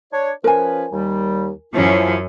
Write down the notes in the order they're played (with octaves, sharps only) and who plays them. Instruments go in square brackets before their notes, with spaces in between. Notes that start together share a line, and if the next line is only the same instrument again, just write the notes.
[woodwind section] D4 C#5
[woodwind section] F3 C#4 B4 [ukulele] A#4 G#5
[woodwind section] D#2 G3
[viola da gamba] F#2 F#3 C#4 [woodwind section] F3 E4 F4